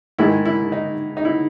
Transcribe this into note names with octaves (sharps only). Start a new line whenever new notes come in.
G#2 D#3 G#3 E4
E4
D#4
D#4
E4